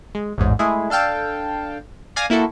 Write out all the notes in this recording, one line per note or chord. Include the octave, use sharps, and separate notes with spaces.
G#3
A1 E2 G#2
G#3 A3 E4 G#4
D4 A4 F5 G5 A5
D5 F5 G#5 A#6
A#3 E4 F#4 A4